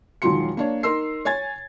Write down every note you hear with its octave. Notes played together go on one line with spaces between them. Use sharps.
E1 D#3 F3 F#3 C6 C#7
A#3 D4 C#5
D#4 A#4 C6 E6 C7
C#5 G#5 G#6 A6